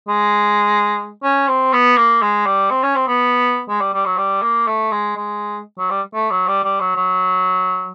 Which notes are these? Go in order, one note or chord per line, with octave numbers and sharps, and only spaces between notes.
G#3
C#4
C4
B3
A#3
G#3
G3
C4
C#4
C4
B3
G#3
G3
G3
F#3
G3
A#3
A3
G#3
G#3
F#3
G3
A3
F#3
G3
G3
F#3
F#3